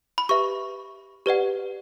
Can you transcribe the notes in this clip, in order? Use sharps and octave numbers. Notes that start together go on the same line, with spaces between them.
B5
G4 B4 E5 C#6
G4 B4 D5 F#5